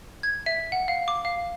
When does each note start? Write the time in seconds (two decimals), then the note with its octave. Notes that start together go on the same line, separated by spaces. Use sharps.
0.23 G#6
0.46 E5
0.72 F#5
0.88 F5
1.08 D6
1.25 F5